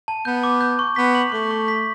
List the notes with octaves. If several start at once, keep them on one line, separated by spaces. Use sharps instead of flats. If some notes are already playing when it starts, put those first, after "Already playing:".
A5
B3 G6
D6
G6
C#6
B3 B6
F#7
A3 C#6
C#6
B6